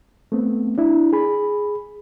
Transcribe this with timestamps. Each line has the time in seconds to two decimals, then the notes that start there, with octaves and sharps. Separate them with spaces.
0.32 A3 B3 C4
0.78 D4 E4
1.13 G#4 B5